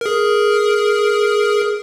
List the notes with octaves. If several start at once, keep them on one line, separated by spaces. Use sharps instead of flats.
G#4 A#4